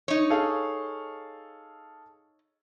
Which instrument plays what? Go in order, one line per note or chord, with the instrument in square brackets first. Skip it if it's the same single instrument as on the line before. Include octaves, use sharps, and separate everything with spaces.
[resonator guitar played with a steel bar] D#4 C#5
[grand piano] G#4 A4 F5